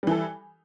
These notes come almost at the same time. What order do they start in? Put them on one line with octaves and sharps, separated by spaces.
G3 E3 A4